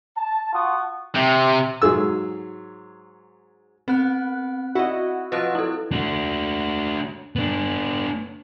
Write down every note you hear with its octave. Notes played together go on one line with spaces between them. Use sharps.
A5
F4 F#4 F#5 C#6 D#6
C3
G#2 F#3 G#4 E6
B3 C4 F#6
E4 F#4 D#5
F3 F#3 F4 B4 D#5 F#6
E4 A4
D4 F#4
B3 D4